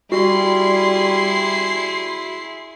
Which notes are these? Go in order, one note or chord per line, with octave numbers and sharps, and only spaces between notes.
G3 E4 F#4 G#4 C6 C7